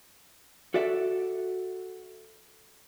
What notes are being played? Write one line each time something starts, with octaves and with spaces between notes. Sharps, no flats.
F#4 A4 D5 E5